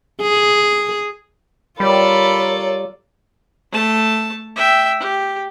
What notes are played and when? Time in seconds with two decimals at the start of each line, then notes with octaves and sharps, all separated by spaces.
0.22 G#4
1.80 G3 F4 A4 A#4 C#5 D5 B5
3.72 A3 A5
4.56 E5 G5
5.00 G4